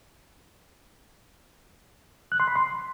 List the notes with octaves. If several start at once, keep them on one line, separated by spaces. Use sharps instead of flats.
F#6
C6
B5
C6